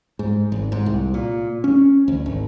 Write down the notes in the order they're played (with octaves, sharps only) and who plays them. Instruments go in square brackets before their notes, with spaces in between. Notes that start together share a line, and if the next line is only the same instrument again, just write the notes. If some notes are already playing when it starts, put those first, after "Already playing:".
[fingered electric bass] G#2
G#1
G#2
C2
A#2
C#4
D2
G#1